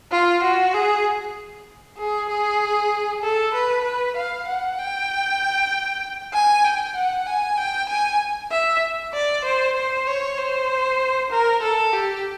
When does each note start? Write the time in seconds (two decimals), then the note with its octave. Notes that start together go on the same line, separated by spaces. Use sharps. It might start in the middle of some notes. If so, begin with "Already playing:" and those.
0.11 F4
0.43 F#4
0.74 G#4
1.98 G#4
2.29 G#4
3.23 A4
3.54 B4
3.84 B4
4.16 F5
4.47 F#5
4.78 G5
6.33 G#5
6.64 G5
6.96 F#5
7.26 G#5
7.57 G5
7.89 G#5
8.51 E5
9.13 D5
9.44 C5
9.76 C5
10.07 C#5
10.38 C5
11.30 A#4
11.62 A4
11.93 G4